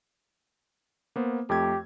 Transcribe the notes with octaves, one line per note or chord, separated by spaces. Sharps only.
A#3 B3 C5
F2 A3 G4 G#6